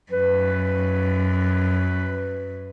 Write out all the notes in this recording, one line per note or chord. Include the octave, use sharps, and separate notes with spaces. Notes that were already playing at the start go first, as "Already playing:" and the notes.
F#2 B4